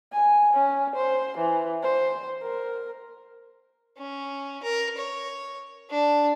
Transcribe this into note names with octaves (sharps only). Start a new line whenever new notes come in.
G#5
C#4
C5
E3
C5
A#4
C#4
A#4
C#5
D4